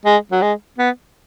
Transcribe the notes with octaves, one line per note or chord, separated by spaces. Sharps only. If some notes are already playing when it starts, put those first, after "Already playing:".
G#3
F#3
G#3
B3